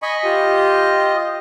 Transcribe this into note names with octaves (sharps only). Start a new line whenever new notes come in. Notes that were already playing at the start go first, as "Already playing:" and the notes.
D#5 G#5 B5 C#6
F4 G4